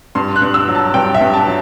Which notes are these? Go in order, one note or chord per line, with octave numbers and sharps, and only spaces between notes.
G2 C6
F#6
G2
E6
F#3
A5
G2 G5
E5
G2
A5
F#3